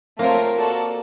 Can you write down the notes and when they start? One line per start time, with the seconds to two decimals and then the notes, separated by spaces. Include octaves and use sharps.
0.19 A3 A#3 C4 F4 A#4 C#5
0.57 F#4 A4 D5